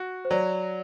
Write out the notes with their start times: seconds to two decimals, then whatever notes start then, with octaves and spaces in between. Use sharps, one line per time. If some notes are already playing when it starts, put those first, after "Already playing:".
Already playing: F#4
0.25 C5
0.31 F#3 D5